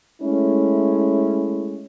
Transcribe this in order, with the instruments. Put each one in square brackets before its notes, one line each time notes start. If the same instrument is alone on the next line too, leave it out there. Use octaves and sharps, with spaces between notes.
[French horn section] G#3 A3 C#4 E4